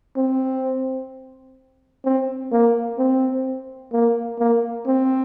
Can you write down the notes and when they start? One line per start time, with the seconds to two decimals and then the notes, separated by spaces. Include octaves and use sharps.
0.17 C4
2.05 C4
2.52 A#3
2.98 C4
3.93 A#3
4.39 A#3
4.87 C4